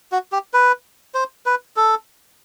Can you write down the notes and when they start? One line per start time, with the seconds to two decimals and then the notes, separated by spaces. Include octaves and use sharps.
0.12 F#4
0.32 G4
0.54 B4
1.15 C5
1.46 B4
1.76 A4